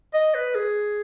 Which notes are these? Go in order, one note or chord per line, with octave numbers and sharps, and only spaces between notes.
D#5
B4
G#4